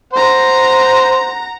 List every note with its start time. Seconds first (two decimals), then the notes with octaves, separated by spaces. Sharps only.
0.13 C5 F#5 A#5